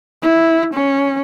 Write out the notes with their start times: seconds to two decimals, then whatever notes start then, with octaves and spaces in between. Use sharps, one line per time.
0.22 E4
0.74 C#4